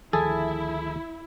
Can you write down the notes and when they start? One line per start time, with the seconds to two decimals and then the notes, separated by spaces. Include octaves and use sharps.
0.13 D2 D#3 F3 E4 G#4 A4 G#5